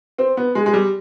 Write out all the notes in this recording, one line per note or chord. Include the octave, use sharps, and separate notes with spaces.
C4
B3
G#3
G#3
G3